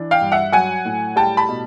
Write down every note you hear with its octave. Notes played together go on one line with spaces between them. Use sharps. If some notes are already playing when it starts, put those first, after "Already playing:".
Already playing: E3 D4
F5 G5
G2
E5 F#5
F#3 F#5 G#5
A2
G3 G5 A5
A5 B5
B2